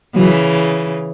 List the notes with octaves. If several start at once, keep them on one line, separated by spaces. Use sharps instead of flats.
C#3 E3 F#3